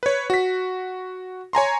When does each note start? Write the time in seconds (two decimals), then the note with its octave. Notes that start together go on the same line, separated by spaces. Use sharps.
0.03 B4 C#5
0.30 F#4 B6
1.53 C#5 G#5 A#5 C6